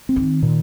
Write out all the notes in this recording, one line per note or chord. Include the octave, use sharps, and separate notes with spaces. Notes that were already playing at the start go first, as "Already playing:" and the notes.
C4
D#3
A#2